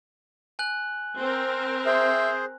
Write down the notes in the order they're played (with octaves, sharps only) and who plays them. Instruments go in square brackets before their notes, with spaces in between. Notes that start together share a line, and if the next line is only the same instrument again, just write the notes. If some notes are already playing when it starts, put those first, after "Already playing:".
[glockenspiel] G#5 F#6 F#7
[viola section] C4 A#4
[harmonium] G#4 C5 [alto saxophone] E5